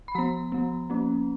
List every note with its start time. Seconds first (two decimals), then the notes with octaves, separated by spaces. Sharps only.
0.08 B5
0.15 F3 B3 A#5
0.52 F3 B3
0.90 F3 A#3 C#4